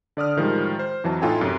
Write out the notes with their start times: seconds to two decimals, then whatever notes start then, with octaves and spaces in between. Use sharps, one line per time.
0.17 D3 D5 D#6 F6
0.37 A2 D#3 F3 G3 G#3
0.79 C5
1.04 F2 E3 F#3 A5
1.22 A2 D#4 F4 A4 G5 G#5
1.41 F#2 C3